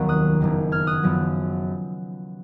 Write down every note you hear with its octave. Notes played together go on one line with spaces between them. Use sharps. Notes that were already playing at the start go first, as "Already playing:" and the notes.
Already playing: F1 D#2 D#3 F#3 B3 A#5 C#6
D#6 F#6
F#1 F2 D#3 F#3
F6 G#6
D#6 F#6
F#1 F#2 F3 B3